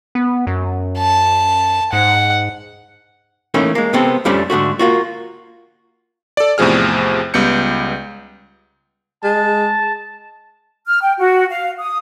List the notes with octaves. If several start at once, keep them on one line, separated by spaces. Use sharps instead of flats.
B3
F#2
A5
G#2 F#5
E3 A3 A#3 C#4 D#4
G#3 A#3
C3 B3 C4 A4
F2 F3 G3 A3 C#4 D4
G#2 D3 A3 F#4
A#3 F4 F#4
A4 D5
E2 A2 C3 F3 G#4 F6
C#2 G3 B3 G6 C#7
G#3 A5
F6
G5
F#4
F5
D#6